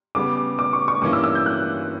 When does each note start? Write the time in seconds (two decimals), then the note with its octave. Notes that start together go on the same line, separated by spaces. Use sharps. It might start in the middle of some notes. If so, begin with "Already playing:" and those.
0.15 C#3 G3 B3 D6
0.59 D6
0.73 C#6
0.88 C#6
1.02 G2 E3 A#3 C#4 E4 D6
1.13 E6
1.24 E6
1.35 G6
1.46 F#6